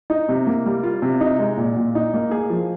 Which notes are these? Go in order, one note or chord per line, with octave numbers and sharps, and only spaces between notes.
D#4
C3
A#3
G3
F4
C3
D#4
G#3
A#2
A#2
D#4
A#3
G#4
F3